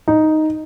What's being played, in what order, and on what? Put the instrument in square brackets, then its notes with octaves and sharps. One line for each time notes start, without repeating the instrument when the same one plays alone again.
[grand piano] D#4